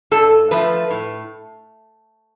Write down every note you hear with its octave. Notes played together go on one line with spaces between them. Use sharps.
G2 A4
F3 A3 B4
A2